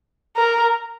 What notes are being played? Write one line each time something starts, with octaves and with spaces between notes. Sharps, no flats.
A#4